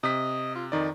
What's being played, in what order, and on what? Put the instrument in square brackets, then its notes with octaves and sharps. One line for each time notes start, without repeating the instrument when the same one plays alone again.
[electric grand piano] C3 B6 [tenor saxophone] D#5
[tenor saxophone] F4
[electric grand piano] F2 D#3 D5 [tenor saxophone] D#4